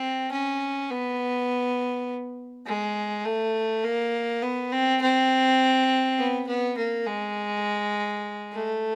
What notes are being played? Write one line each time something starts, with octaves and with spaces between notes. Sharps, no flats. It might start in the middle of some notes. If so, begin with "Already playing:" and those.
Already playing: C4
C#4
B3
G#3
A3
A#3
B3
C4
C4
B3
B3
A#3
G#3
A3